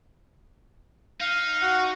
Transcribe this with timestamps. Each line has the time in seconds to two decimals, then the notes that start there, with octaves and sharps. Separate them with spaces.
1.21 D#4 F5
1.61 F#4 F#5